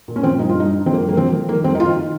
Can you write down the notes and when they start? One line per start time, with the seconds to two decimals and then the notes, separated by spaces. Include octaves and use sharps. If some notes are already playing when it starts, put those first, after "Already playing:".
0.08 A#2
0.16 C#4
0.23 F3 C4
0.39 G2 D#4
0.49 F4
0.55 G2 D#4
0.70 G2
0.86 F3 C4
0.94 A#3
1.01 G2
1.09 A#3
1.17 F3 C4
1.33 F3
1.49 D#3 A#3
1.64 F2 C4
1.75 D#4
1.79 D#3 F4
1.95 D#3